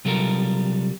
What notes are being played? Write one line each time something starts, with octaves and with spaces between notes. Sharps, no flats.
C3 F#3 G3 F4 A4 A#4